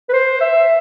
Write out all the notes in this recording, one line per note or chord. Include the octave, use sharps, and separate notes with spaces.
B4
C5
E5